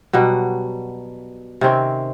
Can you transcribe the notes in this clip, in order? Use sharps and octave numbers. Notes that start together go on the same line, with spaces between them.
B2 F#3 G3 F#5
C3 D#3 C4 C#4